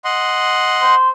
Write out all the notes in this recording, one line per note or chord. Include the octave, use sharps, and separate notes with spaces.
D#5 F#5 C6
C5